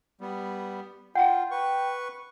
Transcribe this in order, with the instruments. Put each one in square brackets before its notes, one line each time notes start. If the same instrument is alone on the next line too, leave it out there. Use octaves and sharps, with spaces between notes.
[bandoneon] G3 B3
[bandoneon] F4 [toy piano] F#5 A#5 [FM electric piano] G5
[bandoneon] B4 C#6